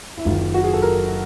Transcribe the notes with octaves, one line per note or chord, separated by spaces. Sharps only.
E4
F#1 F#2 D#3 F4
F#4
G#4
A4
A#4